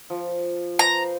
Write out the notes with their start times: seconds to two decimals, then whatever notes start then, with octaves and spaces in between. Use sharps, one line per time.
0.10 F3
0.79 B4 C5 A#5